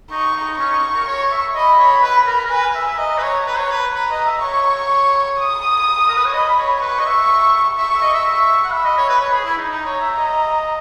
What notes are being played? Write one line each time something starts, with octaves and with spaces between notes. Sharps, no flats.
D#4 C#6
D#4
C#4 C#6
D#4
A#4
C#5
E5
D#5 B5
C#5
B4
A#4
A#4
B4 G#5
E5
E5
D#5 A#5
B4
C#5
B4
C#5
B4
B4 A#5
D#5
E5
C#5 C#6
D#6
A#4
B4
C#5
D#5 B5
C#5
B4 C#6
D#5
E5
E5 C#6
E5
D#5
E5
E5 C#6
F#5
E5 B5
D#5
C#5
B4
C#5
G#4
E4
D#4
D#4 A#5
C#5
E5
D#5